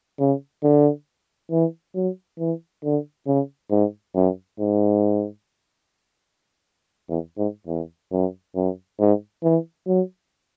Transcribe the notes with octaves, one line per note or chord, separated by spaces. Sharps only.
C#3
D3
E3
F#3
E3
D3
C#3
G#2
F#2
G#2
E2
G#2
E2
F#2
F#2
G#2
E3
F#3